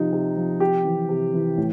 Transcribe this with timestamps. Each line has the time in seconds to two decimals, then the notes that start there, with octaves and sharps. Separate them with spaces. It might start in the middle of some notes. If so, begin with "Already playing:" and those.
Already playing: C3 F3 D#4
0.13 C3
0.37 F3
0.60 C3 G4
0.85 E3
1.09 C3
1.34 E3
1.57 A2